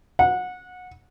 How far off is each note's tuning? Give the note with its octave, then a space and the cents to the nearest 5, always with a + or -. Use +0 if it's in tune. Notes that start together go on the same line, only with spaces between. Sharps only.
F#5 -25